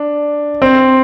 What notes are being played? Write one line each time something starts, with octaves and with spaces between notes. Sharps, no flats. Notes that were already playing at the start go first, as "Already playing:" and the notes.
Already playing: D4
C4